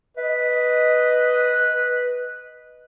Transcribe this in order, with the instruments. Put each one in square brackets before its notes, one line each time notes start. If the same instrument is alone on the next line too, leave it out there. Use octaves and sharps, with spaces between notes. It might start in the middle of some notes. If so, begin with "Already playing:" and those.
[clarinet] B4 [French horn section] D#5